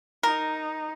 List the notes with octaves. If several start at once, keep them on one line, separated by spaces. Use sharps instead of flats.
D#4 A#4